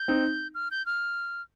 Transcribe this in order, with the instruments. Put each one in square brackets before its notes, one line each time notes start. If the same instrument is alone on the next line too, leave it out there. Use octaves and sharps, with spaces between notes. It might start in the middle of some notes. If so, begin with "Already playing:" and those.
Already playing: [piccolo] G6
[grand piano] C4 D#4
[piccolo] F6
G6
F6